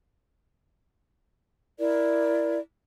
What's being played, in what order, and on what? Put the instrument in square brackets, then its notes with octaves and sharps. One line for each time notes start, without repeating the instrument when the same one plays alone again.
[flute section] E4 A#4 D5